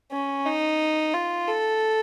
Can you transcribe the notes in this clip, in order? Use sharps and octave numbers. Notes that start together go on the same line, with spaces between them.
C#4
D#4
F4
A4